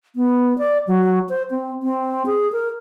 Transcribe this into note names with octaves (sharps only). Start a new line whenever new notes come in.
B3
D5
F#3
C5
C4
C4
G#4
A#4